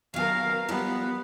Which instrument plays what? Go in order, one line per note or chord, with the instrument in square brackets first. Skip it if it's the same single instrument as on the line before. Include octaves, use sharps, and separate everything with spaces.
[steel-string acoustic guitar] F#3 B3 [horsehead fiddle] A#4 F5
[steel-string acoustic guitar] F3 G3 [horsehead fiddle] B3